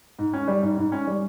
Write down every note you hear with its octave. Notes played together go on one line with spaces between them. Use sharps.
G#2
C#4
G3
G#2
G#2
C#4
G3